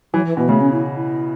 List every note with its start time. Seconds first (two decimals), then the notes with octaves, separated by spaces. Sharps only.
0.14 E3 F#3
0.26 E3
0.37 B2 E3
0.49 C#3 A3
0.60 C#4
0.72 E4
0.96 E4